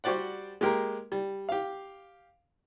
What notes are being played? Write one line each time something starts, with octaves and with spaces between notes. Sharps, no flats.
G3 F#4 G4 C5 D5 F#5
G#3 A#3 G4 A#4
G3
G4 F5